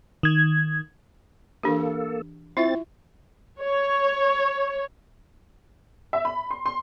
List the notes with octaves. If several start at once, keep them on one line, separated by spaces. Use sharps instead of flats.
D#3 G#6
E3 A#3 D4 G4 A4
C4 E4 F4 E5 A6
C#5
E5
B5
C6
C6